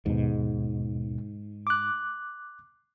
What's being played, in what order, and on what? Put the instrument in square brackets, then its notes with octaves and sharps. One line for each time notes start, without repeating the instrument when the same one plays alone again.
[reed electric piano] D#2 B2 [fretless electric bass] G#2
[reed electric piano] D6 F#6